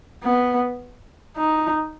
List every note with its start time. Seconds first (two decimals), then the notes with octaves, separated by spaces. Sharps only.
0.23 B3
1.36 D#4